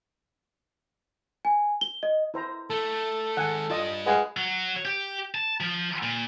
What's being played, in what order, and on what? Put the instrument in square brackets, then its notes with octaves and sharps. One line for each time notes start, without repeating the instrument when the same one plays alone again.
[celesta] G#5
G7
D#5
[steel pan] E4 C5 A#5
[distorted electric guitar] A3 [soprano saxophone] A4
[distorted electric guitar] D#3 G#3 [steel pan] F#5 G#5
[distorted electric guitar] G3 D4 [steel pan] F4 D#5 D#6
[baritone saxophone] G#3 [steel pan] B4 F5 [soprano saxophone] F#5
[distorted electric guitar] F#3
G4
A5
F3
A#2